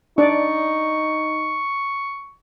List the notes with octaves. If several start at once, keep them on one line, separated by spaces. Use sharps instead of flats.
D4 D#4 D5 C#6